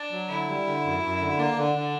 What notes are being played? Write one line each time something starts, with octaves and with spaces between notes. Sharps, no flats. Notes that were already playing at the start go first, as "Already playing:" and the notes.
Already playing: D4
F#3
D3 E4
G3
D3
F#2
F#2
D3
A#3 D4
D3
D3